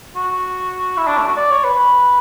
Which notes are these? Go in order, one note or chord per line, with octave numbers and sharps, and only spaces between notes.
F#4
E4
D4
A3
F#4
D5
C#5
B4